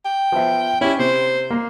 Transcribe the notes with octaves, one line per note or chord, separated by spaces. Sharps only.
G5
F3 B3 E5
C#4 E4 G4
C3 C5
A#3